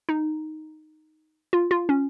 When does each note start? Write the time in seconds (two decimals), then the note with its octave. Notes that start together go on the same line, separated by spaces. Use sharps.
0.09 D#4
1.53 F4
1.71 F4
1.89 C#4